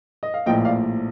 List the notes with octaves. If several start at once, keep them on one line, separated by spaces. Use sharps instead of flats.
D#5
F5
A#1 A2 F3 A#3 D#5 G5
D5 F5